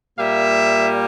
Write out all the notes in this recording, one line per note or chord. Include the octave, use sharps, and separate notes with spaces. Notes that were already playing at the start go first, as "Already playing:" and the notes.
A#2 G3 A#3 E5